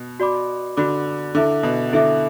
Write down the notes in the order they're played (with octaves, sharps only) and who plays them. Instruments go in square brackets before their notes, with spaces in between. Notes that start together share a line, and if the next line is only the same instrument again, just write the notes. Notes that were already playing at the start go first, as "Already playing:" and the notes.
Already playing: [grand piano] B2
[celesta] F#4 D5 B5 D6
[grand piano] D3 [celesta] F#4 D5 B5 D6
[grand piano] D3 [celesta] E4 A4 E5 D6
[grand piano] B2
[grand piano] D3 [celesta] E4 A4 E5 D6